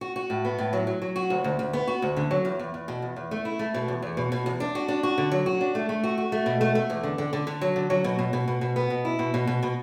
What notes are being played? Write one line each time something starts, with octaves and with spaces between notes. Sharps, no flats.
F#4
F#4
A2
B3
A2
F#3
F#3
F#3
F#4
D2
D2
D2
B3
F#4
D2
D3
F#3
E2
E2
E2
B2
E2
E2
A3
E4
A3
B2
E2
E2
B2
B2
E2
D4
F#4
D4
F#4
D3
F#3
F#4
D4
A3
A3
F#4
F#4
A3
B2
A3
A3
E2
D3
D3
D3
D3
F#3
D3
F#3
B2
B2
B2
B2
B2
B3
B2
E4
B2
B2
B2
B2